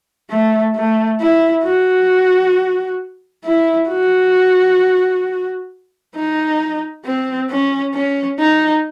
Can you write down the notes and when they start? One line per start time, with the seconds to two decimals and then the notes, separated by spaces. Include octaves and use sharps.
0.30 A3
0.75 A3
1.20 E4
1.64 F#4
3.45 E4
3.89 F#4
6.15 D#4
7.05 C4
7.50 C#4
7.94 C#4
8.39 D#4